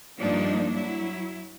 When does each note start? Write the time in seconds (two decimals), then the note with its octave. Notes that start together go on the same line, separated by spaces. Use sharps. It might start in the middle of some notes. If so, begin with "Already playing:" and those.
0.20 G2 F3 A#3 D4 D#4
0.74 F#3 E4